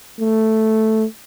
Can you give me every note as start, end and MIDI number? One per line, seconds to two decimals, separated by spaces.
0.20 1.04 57